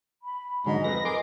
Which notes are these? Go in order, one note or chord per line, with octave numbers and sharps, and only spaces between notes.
B5
G#2 D3 F#3 G#3 D#5
F2 B4 A#6
G#4 A#4 C6 D6